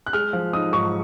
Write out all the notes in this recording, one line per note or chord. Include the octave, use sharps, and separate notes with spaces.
F#6
G#3 F6
F3
D#4 D#6
G#2 C#6